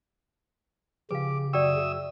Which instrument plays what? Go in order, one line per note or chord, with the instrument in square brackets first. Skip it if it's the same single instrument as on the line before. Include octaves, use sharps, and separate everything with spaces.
[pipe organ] C#3 [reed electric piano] F3 G4 G#4 [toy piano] B4 F5 [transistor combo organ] D6
[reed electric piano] F#2 F#4 C#6 [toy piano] D5 G5 [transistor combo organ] E5 D#6 E6